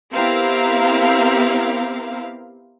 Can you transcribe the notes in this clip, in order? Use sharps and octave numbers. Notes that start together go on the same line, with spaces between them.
B3 C4 E4 G4 A#4 F5